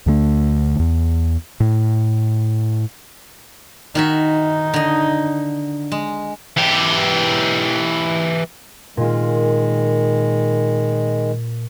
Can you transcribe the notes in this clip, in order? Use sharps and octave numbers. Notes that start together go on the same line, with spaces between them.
D2 D3 A3
E2
A2
D#3 D#4 F#4 E5
D3 D#5
G#3
E3 G4
A#2 D#3 G#3 F4